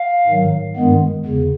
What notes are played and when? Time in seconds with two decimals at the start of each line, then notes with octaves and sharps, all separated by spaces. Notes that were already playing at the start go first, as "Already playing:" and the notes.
Already playing: F5
0.27 G#2 D#3 F#3
0.76 G2 D#3 G#3 B3
1.25 E2 C#3